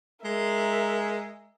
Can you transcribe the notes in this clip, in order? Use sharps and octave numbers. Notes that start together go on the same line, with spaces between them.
G#3 A#4 E5